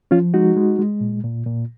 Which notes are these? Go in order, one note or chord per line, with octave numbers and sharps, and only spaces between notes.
F3 C#4 F4
G#3 D#4 F#4
G#3
G#3
A#2
A#2
A#2